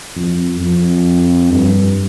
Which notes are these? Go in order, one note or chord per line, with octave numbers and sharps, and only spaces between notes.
F2
F2
G2